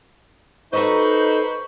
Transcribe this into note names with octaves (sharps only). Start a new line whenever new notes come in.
D#4 F#4 A4 B4 C5 D#5 C#6